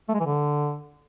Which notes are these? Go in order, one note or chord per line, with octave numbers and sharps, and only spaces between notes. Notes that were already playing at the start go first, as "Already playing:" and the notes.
A3
G#3
E3
D3